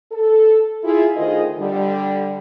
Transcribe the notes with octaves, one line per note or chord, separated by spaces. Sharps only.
A4
E4 F4 G#4
D2 D#3 F4 G#4 C5 D#5
D3 G3